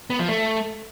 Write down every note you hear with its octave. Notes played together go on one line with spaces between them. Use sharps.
B3
F3
A3